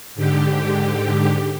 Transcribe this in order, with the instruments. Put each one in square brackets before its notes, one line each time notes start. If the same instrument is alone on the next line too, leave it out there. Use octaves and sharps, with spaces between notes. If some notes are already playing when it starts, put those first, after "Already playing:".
[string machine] G#2 D3 G4